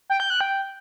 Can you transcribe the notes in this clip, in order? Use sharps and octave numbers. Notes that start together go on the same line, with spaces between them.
G5
G6
F#6
G5